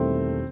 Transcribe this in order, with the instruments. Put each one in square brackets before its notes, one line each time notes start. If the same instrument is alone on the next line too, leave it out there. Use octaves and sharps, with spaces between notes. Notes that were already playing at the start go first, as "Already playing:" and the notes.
Already playing: [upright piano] E1 E2 D#3 G3 [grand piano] A3 C4